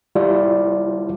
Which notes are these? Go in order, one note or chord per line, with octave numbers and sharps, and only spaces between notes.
G3 E4 F4 D5